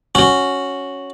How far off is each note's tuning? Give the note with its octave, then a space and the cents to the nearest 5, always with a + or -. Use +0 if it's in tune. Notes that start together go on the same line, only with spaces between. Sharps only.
C#4 +0 F#4 +0